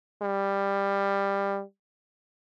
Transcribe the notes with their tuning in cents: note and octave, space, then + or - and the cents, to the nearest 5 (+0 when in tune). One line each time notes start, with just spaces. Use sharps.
G3 +15